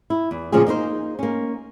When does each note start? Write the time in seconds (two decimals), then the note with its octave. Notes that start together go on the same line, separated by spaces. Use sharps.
0.10 E4
0.31 E2
0.52 A#2 D3 F3 C#4 F4 G#4
0.67 A#3 D#4 A#4 C5
1.19 A#3 C#4